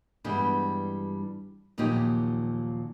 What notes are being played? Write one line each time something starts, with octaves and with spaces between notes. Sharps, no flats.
G2 E3 G3 G#3 B3 D4
D#2 A#2 F3 F#3 D#4 G4